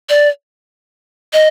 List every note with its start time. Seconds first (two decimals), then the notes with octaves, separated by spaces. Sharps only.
0.10 D5
1.33 D#5